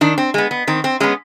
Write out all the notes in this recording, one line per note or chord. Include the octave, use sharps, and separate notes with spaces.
D#3 D4
C4
G#3 B3
B3
D#3 C4
C4
G#3 B3 C#4